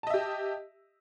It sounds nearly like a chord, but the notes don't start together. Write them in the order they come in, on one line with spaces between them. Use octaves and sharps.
A5 D#5 E5 G4